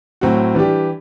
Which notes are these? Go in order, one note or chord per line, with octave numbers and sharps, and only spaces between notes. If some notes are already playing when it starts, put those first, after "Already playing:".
A2 F#3 C4 F#4
E3 G3 D4 G4